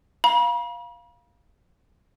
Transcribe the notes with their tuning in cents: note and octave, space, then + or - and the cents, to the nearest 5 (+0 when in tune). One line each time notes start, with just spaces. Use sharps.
F5 +0 B5 -45